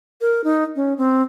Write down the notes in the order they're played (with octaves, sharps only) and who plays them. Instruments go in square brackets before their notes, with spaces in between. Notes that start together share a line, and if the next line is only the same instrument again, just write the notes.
[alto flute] A#4
D#4
C#4
C4